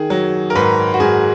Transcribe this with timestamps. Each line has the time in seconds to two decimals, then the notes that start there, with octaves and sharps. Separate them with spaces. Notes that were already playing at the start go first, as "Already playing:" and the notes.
Already playing: D#3 G#4
0.10 F#3
0.50 A#4
0.55 G#2 B4
0.94 F#4
1.00 G#2 G#4